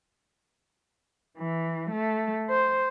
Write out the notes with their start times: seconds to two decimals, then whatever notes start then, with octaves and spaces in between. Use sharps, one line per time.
1.38 E3
1.90 A3
2.50 C5